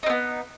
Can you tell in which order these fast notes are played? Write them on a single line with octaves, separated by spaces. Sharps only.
D#4 C4 B3